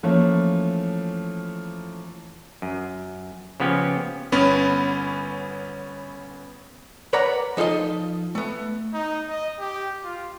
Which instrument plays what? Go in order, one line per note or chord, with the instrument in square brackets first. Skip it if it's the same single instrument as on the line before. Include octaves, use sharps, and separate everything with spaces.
[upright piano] E3 F3 A3 A#3 C#4
[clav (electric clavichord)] F#2
C#3 F3 B3 C#4 G4
[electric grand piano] G1 B3 C#4 B5
[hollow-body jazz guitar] A#4 B4 C#5 D5 F#5 A#5
F3 D#4 F4 A4 D#5
A3 B3
[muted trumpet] D#4
D#5
G4
F4